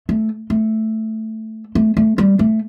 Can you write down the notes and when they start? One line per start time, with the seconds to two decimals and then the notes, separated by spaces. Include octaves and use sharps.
0.09 A3
0.50 A3
1.75 A3
1.97 A3
2.18 G3
2.39 A3